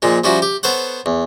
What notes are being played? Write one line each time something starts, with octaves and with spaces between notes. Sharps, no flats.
A#2 F3 G#3
F3 G3 C#4 E4 F#4
G4
B3 A4 C5 C#5 F#5
E2